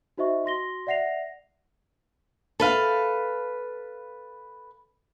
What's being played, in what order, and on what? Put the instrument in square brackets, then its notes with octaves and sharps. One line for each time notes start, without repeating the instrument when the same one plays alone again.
[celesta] D#4 F#4 C5 D#5 E5 C#6
F#4 C6 A#6 G7
D5 E5 F#5 A#6 C7 F7
[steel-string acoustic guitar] A4 B4 F5